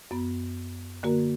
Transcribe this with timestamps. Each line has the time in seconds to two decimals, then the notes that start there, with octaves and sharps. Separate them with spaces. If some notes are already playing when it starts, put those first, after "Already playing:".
0.11 F#2 B3
1.03 D3 A#3 F#4 A#4